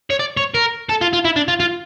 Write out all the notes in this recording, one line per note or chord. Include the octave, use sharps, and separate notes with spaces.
C#5
D5
C#5
A#4
A4
F4
F4
E4
D4
F4
F4